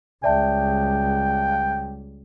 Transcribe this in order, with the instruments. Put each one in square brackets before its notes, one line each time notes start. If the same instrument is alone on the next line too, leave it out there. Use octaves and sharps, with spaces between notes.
[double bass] C#2 G3 [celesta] D5 E5 A5 [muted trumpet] G5